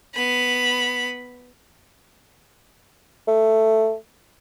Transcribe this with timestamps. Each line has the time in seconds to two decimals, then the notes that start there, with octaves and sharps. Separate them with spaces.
0.14 B3 B5
3.28 A3